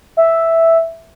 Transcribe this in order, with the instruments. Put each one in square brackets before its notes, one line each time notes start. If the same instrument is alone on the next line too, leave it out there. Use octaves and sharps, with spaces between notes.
[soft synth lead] E5